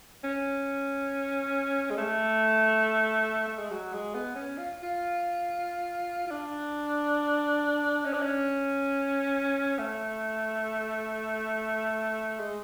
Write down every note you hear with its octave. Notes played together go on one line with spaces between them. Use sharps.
C#4
G#3
A3
A3
G#3
F#3
G#3
B3
C#4
F4
F4
F4
D4
C#4
D4
C#4
A3
G#3